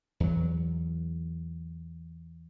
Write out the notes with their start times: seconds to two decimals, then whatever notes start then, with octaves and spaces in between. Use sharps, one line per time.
0.20 E2 F#3